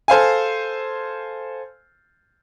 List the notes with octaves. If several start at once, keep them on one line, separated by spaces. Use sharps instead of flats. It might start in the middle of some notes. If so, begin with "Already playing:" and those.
A4 C5 F5 G#5